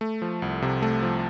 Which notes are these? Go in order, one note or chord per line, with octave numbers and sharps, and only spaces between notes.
A3
F3
C2
C3
A3
F3